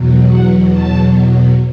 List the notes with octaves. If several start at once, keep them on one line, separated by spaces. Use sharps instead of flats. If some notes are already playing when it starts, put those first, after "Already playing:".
Already playing: E2 B2 F#3
F#5
A5